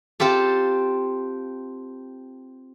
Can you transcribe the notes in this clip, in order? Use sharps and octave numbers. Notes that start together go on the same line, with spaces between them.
C4 F4 G4 A4